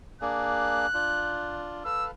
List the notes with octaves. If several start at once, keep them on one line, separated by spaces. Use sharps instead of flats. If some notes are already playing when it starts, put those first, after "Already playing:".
A#3 D4 G#4 F#6
D4 F4
A4 B4 F5 E6